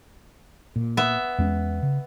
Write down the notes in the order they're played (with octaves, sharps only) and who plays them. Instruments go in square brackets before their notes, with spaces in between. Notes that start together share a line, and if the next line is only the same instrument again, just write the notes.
[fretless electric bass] A#2
[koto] B3 E5
[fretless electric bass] E2 G#3 C#4
C#3